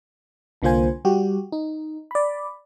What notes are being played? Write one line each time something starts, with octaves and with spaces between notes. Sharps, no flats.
C2 D3 A#3 F4 C5 G#5
G3 F#4 G4
D#4
D5 B5